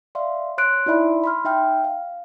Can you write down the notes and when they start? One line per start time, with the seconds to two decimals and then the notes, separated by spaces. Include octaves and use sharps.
0.15 D5 E5 F5 C6
0.58 C#5 C6 F#6 D7
0.86 D#4 E4 D5 E5 B5 C6
1.24 B5 C6 F6
1.45 D#4 E5 G5 F6
1.84 F5